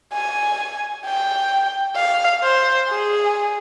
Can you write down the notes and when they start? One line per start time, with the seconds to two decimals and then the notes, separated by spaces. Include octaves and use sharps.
0.13 G#5
1.05 G5
1.96 F5
2.43 C5
2.89 G#4